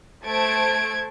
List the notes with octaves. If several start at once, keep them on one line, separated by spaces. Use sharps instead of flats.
A3 C5 A5 G#6 D7